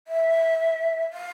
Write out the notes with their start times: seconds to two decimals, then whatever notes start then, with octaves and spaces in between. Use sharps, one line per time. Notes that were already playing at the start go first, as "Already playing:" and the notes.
0.08 E5
1.13 F5